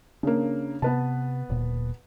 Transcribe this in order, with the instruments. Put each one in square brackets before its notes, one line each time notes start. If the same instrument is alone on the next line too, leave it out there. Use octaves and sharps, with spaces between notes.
[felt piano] C#3 A#3 [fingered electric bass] D4
[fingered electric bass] C3 [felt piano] B3 B4 A5
[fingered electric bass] D1 A#2